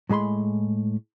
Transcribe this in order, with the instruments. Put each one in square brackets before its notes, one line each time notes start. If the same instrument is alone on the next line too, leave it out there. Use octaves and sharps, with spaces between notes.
[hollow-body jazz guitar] A2 G#3 G#4 B5 C6